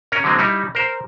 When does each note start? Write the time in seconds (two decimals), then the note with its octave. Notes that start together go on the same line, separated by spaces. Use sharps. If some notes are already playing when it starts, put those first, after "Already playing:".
0.12 C#4 A#4
0.24 D3 F#3 G#3 A#3 C4
0.39 G3 D#4 E4
0.75 A#4 C5